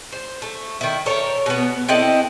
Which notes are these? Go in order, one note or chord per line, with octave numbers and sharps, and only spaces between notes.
C5
A3
D#3 E4
A4 A#4 C#5
B2 B3
C4 E4 A4 D#5